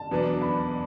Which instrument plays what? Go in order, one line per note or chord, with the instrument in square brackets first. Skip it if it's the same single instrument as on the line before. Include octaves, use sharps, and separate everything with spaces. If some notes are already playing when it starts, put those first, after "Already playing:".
Already playing: [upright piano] A5
[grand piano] E2 B2 F#3 B3 D4
[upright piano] B5